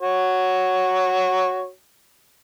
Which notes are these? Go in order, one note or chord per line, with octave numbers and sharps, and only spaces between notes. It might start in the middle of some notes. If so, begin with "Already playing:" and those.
F#4 C#5